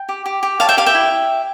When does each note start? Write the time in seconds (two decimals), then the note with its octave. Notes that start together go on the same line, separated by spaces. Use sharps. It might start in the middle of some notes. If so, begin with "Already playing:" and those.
Already playing: G5
0.09 G4
0.26 G4
0.43 G4
0.60 C#5 F5 A5
0.69 E5 G5
0.77 G4 F5
0.86 E5 G5
0.95 E4